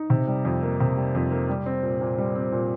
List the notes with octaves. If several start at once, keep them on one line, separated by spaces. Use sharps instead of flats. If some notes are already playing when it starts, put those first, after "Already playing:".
Already playing: D#4
C3
G3
F2
A#3
C3
G3
F2
A#3
G3
C4
A#2
A#2
G3
C4
A#2